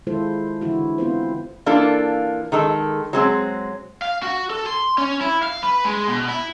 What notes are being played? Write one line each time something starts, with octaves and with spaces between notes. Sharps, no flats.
D#3 G#3 E4 F4 A4 C5
D3 E3 D4 E4 F#4
B3 C4 E4 F4 B4 C5
E3 A#3 D4 F4 A4
D#3 G#3 A4
F#3 G#3 C4
F5
F#4
A4
C6
C#4
E4
F5
B4
G#3
B2
E4